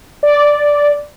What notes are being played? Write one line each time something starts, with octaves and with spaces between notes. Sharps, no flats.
D5